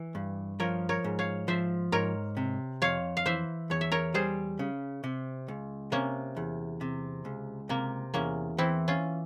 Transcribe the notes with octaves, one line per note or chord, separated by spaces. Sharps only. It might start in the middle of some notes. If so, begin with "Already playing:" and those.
Already playing: E3
G2
F3 A#4 C#5
A#4 C#5
G#2
C#5 F5
F3 C5 E5
G#2 A#4 C#5
C3
F2 C#5 F5
F5
E3 C5 E5
E2 C#5
E5
A#4 C#5
G3 G#4 C5
C#3
C3
C#2
C3 A#3 C#4
E2
C3
C#2
C3 A#3
E2 A#3 C#4
E3 C4 E4
C#4 F4